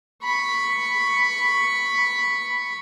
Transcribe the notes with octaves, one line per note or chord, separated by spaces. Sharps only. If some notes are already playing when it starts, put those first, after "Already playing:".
B5 C#6